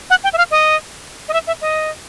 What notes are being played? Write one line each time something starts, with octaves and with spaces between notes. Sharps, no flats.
F#5
G5
E5
F5
D#5
D#5
E5
E5
D#5